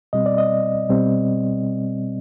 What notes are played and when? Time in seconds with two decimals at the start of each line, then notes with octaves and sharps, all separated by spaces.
0.13 B2 G3 C4 D#5
0.26 D5
0.38 D#5
0.89 B2 G3 C4